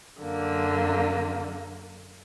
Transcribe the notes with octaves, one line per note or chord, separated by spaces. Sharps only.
F#2 D3 A#3